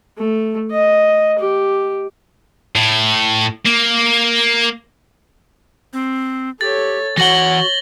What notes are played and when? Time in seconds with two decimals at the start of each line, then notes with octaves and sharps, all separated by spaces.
0.17 A3
0.71 D#5
1.38 G4
2.76 A2
3.65 A#3
5.93 C4
6.61 G4 A4 C#5 A6
7.17 E3 F#4 C#5 F#5 A#6 F#7 G7